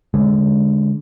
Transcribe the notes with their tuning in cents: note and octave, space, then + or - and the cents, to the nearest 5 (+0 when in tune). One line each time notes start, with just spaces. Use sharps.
D3 -15 G#3 +0